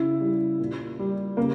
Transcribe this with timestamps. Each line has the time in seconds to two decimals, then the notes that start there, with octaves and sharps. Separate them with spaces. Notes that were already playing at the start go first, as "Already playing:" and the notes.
Already playing: C#3 E4
0.21 G3
0.60 A#2
0.99 G3
1.37 C#3 A#3